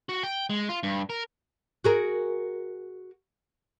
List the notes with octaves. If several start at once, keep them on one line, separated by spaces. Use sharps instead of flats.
F#4
G5
G#3
F4
G2
A#4
F#4 G#4 A#4